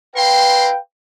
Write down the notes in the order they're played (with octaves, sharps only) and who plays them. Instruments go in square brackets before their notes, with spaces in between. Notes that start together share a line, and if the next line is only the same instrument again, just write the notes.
[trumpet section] E4 A#4 C6 [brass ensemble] B4 F5 G5